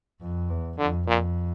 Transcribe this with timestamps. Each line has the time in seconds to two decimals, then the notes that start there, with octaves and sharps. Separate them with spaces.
0.21 F2
0.49 E2
0.79 F2 D3
1.07 F2 A#2